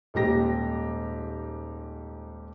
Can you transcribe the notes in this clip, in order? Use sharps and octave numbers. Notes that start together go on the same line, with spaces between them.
D#1 G#2 G4 A#6